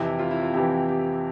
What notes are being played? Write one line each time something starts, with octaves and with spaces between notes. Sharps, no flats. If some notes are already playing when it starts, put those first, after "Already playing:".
Already playing: F2 C3 E3 E4
F4
E4
F4
F2 C3 E3 G4
G4